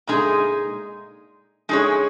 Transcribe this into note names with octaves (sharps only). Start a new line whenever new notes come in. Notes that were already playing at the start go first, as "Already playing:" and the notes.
A#2 G#3 D#4 G#4
G#3 D#4 G#4 C#5